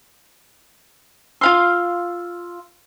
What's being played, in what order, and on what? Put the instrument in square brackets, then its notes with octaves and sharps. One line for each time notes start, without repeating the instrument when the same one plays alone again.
[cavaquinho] F4 F5 C6 [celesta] E6 F6